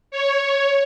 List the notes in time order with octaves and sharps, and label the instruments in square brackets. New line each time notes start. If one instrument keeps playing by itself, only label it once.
[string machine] C#5